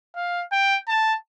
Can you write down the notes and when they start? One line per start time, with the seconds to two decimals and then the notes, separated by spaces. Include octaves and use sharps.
0.16 F5
0.52 G5
0.88 A5